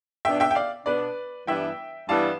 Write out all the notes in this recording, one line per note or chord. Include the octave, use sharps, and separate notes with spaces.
B2 B3 D4 E5 G5
E5 G5
G5
D5 F5
B2 B3 D4 B4 D5
G2 E3 G3 B3 E4 E5 G5
G2 E3 G3 B3 E4 F5 A5